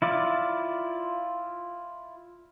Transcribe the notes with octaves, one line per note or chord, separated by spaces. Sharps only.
E4 F4 D5